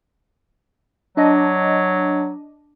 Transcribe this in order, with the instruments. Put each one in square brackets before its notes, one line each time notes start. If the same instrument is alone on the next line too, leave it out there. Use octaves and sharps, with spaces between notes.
[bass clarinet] F#3 [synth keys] D4 D#5